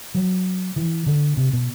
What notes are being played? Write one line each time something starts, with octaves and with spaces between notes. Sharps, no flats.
F#3
E3
D3
C3
B2